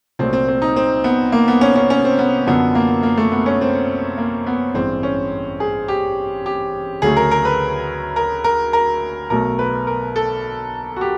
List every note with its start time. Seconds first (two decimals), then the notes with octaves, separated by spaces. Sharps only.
0.19 C2 A#2 F#3 A3 C4
0.33 C4
0.48 C4
0.62 D#4
0.76 C4
1.04 B3
1.32 A#3
1.48 B3
1.61 C#4
1.75 C#4
1.90 C#4
2.04 C4
2.19 B3
2.47 F#2 D3 F3 B3
2.75 A#3
3.03 A#3
3.17 A3
3.32 B3
3.46 C#4
3.61 C4
4.18 A#3
4.46 B3
4.74 A1 G2 E3 G#3 C4
5.03 C#4
5.60 G#4
5.88 G4
6.46 G4
7.02 D2 C#3 F#3 A3 G#4
7.17 A#4
7.31 A#4
7.45 B4
8.16 A#4
8.44 A#4
8.73 A#4
9.30 B1 B2 F#3 A3 A#4
9.59 B4
9.87 A#4
10.16 A4
10.96 F#4
11.01 G4